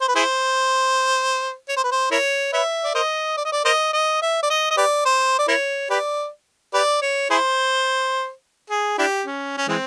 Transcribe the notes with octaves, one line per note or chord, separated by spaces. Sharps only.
C5
B4
E4 G#4 C5
C#5
C5
B4
C5
E4 A#4 C#5
B4 C#5 E5
D5
A#4 C5 D#5
D5
D#5
D5
A#4 C5 D#5
D#5
E5
D5
D#5
D#5
G4 B4 D5
C5
D5
E4 A#4 C#5
G4 B4 D5
G4 B4 D5
C#5
E4 G#4 C5
G#4
D4 E4 G4
C#4
C#4
E3 G#3 C4